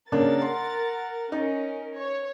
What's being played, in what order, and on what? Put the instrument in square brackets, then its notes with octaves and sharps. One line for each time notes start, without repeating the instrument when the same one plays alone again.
[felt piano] C#3 A#3 D4 [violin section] A#4 F#5 A6
[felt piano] C6
[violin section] C#4 A#4 [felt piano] D#4
[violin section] C#5